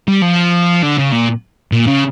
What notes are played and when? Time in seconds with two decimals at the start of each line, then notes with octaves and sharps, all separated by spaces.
0.08 G3
0.22 F3
0.83 D3
0.98 C#3
1.12 A#2
1.73 A#2
1.88 C#3